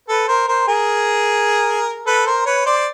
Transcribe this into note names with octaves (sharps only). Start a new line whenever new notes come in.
A4 B4
A#4 C5
A#4 C5
G#4 A#4
A4 B4
A#4 C5
B4 C#5
C5 D5